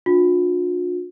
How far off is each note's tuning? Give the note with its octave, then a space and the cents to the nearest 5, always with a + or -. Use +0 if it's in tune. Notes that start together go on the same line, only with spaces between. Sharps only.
D4 +0 F4 +45